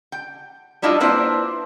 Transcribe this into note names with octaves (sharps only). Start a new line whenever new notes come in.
G5
G3 D4 E4 F4 D#5
A#3 C4 D4 E4 B4 C5